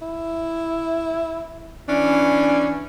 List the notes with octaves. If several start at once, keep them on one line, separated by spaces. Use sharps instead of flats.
E4
E3 C#4 D4